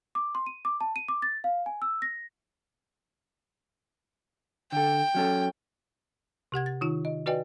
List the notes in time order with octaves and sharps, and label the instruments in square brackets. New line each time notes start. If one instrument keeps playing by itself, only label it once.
[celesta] D6
C6
D#7
D6
A5
D#7
D6
A6
F5
G#5
E6
A#6
[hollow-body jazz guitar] D3 A4 [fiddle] G5
[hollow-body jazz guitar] F#3 C#4 A4
[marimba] C3 G4 F#5 G#6
A6
D#3 D#4 F4
D#5
F#4 B4 D5 D#5 G5 G#5